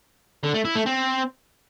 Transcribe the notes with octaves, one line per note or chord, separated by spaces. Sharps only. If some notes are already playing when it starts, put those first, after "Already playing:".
D3
A3
E4
A3
C4